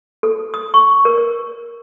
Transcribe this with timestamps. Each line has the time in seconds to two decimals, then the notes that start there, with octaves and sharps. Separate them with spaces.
0.23 A4
0.54 D#6
0.74 C#6
1.05 A#4
1.18 A#4